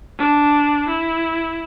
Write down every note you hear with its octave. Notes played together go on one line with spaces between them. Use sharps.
D4
E4